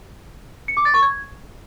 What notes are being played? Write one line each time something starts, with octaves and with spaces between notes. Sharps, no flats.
C#7
D6
A6
C#6
G#6